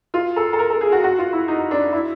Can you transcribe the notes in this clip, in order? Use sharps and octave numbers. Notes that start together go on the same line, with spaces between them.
F4
A4
A4
A#4
A4
G#4
F#4
F#4
F4
E4
D#4
D4
E4